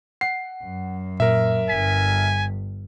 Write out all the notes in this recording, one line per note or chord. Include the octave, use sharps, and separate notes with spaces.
F#5 C7
F#2
A#2 A#4 E5
G1 G2 G#5 B6